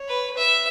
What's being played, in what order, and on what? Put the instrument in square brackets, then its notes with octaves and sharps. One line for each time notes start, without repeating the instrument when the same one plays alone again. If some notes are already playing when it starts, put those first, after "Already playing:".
Already playing: [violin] C#5
[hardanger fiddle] B4
[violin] B4 [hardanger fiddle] E5